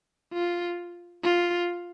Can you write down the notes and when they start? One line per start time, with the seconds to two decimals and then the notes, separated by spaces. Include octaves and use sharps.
0.33 F4
1.24 F4